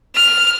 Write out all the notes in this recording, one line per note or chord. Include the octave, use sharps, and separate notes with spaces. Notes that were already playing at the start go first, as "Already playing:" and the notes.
F6